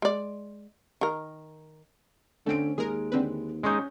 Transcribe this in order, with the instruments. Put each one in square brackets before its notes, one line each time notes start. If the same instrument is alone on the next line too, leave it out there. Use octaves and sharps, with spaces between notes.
[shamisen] G#3 D5
D#3 A#4
[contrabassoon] D3 [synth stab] A3 C4 [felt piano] C#4 D7
[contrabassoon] D#2 [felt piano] G#3 [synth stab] G#4 A#4
[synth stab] D3 C4 B4
[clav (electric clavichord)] G#3 D#4 [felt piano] C#4 C#6 G6